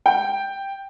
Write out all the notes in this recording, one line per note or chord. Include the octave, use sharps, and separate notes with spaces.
G5